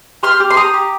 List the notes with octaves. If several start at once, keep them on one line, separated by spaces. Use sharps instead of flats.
G4 C6 F6
G4
C6
G4 A#5 D#6
G4